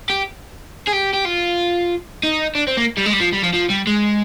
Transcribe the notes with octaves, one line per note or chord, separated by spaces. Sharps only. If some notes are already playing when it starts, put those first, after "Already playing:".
G4
G#4
G4
G4
F4
D#4
D4
C4
A#3
G3
G#3
G3
F3
G3
F3
F3
G3
G#3